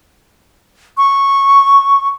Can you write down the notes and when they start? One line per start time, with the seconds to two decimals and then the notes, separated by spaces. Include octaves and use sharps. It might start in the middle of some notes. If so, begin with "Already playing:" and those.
0.97 C#6